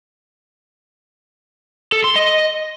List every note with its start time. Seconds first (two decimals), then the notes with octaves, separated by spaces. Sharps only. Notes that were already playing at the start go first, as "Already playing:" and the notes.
1.92 A4
2.04 C6
2.16 D#5